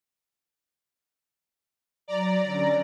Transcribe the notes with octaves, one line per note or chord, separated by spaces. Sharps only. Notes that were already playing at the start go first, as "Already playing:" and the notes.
F#3 D5 A#5
D3 C#4